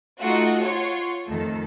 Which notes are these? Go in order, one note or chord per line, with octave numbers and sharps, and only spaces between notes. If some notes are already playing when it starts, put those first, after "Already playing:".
A3 D#4 F4 F#4 F#5
F4 C#5 F#5 C6 C#6
F2 D#3 A3 A4